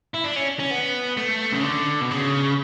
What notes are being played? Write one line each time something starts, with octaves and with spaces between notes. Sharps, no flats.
E4
D4
C#4
C#4
B3
A3
C#3
D3
B2
C#3